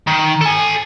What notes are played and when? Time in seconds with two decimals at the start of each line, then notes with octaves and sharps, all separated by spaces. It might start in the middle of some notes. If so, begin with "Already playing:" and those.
0.07 D#3
0.41 A4 G#5